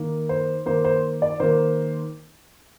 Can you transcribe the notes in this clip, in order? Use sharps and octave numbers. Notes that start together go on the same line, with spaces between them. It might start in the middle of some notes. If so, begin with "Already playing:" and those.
Already playing: D#3 A#3
C5
D#3 A#3 C5
C5
D5
D#3 A#3 C5